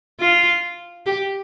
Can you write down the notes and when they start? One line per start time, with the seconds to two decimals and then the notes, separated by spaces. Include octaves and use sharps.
0.20 F4
1.06 G4